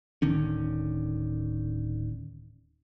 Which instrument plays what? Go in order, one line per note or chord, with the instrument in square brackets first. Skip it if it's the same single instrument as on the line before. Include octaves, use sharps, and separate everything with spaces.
[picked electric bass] D1 D3 D#3 C#4